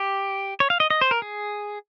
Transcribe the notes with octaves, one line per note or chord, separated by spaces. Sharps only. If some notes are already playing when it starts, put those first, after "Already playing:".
Already playing: G4
C#5
F5
D#5
D#5
C5
A#4
G#4